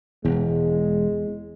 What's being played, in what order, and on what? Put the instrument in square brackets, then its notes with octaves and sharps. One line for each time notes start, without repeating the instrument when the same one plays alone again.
[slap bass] E1 [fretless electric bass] E2 [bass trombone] G#3